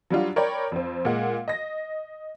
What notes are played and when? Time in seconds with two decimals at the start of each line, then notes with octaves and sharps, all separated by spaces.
0.10 F#3 G3 D4 F4 F#4
0.36 A#4 C#5 D5 G5 B5
0.72 F2 C4
1.05 A#2 G#3 F#5
1.48 D#5 A#6